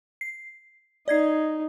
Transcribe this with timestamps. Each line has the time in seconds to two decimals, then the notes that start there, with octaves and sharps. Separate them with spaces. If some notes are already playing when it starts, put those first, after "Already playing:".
0.21 C7
1.08 D#4 D5 G#6 C7